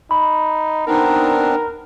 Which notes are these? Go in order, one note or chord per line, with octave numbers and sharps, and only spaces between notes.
D#4 B5
B3 C4 D4 D#4 A#4